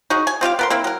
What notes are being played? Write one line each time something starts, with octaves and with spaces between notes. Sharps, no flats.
D#4 F#4 G#4
G#5
C4 F4 G4 F5
B3 A#4 C6
A#3 C4 E4
F#3 A#4